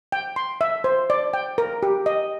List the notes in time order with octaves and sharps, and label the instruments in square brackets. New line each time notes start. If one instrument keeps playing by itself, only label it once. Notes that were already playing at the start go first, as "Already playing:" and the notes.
[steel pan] G5
C6
E5
C5
D5
G5
A#4
G4
D#5